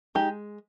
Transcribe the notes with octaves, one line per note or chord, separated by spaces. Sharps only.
G#3 D#4 G4